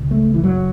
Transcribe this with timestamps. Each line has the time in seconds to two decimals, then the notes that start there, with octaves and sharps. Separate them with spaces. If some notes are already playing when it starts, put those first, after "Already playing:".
Already playing: C#2 C#3
0.11 A3
0.34 E3
0.43 F#2 C#3 F#3